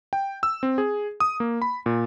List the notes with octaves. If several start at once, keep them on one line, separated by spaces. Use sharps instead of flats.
G5
E6
C4
G#4
D#6
A#3
B5
A#2